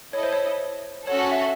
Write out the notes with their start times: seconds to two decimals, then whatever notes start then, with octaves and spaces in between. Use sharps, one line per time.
0.13 E4 A4 C#5 D#5
0.23 C5
0.33 C#5
1.07 C#4 F#4 A4 C#5
1.31 E5